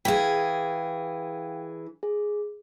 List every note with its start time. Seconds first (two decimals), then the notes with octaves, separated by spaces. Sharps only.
0.05 E3 G#4 F5 G5
2.03 G#4